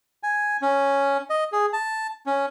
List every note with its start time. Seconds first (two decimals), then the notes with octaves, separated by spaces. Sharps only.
0.23 G#5
0.62 C#4
1.30 D#5
1.52 G#4
1.73 A5
2.26 C#4